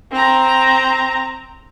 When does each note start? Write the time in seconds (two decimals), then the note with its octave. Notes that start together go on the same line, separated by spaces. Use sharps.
0.12 C4 A#5